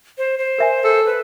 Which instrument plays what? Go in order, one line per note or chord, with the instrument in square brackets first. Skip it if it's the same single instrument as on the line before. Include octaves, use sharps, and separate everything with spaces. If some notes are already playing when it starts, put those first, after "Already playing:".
[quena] C5
C5
[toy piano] A#4 E5 G#5
[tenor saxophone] A4
[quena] B4